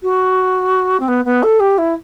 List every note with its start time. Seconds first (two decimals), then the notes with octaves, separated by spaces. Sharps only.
0.03 F#4
1.00 C4
1.08 B3
1.25 B3
1.43 A4
1.60 G4
1.78 E4